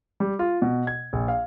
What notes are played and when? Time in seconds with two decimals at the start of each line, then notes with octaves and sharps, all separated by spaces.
0.20 G3
0.39 F4
0.62 B2
0.87 G#6
1.13 A#1
1.28 F5